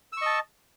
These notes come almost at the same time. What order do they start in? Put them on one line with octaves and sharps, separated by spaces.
E6 C#6 D#5 A5